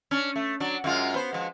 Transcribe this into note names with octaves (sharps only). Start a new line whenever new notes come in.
C#4 D4
A3
F#3 D4
F#2 G#3 F4
B3 C5
F3 G#3